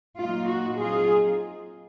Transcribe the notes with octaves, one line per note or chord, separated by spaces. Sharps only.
A#2 F#3 A#3 D#4 F4
F#4
F#3 C4 D#4 F4 G#4